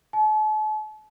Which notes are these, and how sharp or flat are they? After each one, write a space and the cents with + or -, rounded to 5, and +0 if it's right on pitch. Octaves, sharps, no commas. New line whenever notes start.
A5 -45